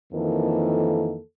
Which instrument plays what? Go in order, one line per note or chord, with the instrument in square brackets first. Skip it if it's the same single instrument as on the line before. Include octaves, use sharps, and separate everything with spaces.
[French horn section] F2 D#3 E3 A#3 A4